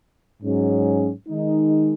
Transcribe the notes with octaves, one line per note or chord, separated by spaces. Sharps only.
G#2 F#3 C#4 G#4
D#3 G#3 D#4